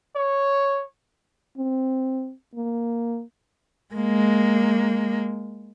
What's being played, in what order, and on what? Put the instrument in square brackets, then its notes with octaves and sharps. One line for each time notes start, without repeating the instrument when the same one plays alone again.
[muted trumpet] C#5
[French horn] C4
A#3
[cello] G#3 A#3